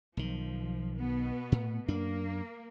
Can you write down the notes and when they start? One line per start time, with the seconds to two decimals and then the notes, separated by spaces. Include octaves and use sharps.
0.17 B1 D#3 F3
0.98 B2 B3
1.52 A2
1.88 F#2 A#3 D4